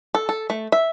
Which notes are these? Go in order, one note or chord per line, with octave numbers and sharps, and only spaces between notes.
A4
A4
A3
E5